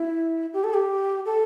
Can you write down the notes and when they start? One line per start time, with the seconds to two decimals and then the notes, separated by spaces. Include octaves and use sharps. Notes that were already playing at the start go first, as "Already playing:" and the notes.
Already playing: E4
0.53 G4
0.64 A4
0.74 G4
1.25 A4